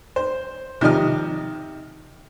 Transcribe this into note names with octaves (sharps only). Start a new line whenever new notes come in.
C5
C3 D#3 F3 D#5 F6